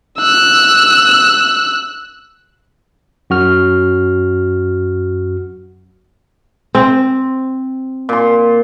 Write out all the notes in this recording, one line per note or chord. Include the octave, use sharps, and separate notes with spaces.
E6 F#6
F#2 F#4 F6
C4
A#2 C6